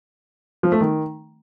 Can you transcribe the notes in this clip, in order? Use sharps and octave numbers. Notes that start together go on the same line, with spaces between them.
F3
A3
D#3